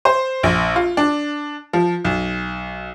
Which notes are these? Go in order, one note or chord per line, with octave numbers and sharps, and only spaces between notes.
C5
A#1
F4
D4
F3
B1